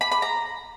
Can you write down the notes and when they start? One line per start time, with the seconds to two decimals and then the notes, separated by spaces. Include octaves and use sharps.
0.01 B5
0.11 B5
0.22 A#5